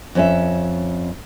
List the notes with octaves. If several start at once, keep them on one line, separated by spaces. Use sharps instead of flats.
F2 C#4 E5